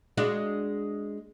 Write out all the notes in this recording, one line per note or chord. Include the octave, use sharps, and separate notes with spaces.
G#3 D4 F#4